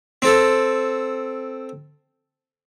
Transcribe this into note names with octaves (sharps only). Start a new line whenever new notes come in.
C4 A4